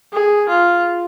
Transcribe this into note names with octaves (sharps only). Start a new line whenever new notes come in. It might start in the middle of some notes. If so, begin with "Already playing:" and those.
G#4
F4